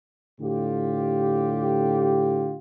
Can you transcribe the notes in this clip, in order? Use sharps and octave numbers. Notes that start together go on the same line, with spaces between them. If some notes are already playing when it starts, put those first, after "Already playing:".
A2 D3 F4 G4